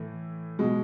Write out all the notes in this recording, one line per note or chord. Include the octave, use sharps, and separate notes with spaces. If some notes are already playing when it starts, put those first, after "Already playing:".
Already playing: A2 E3 A3
B2 G#3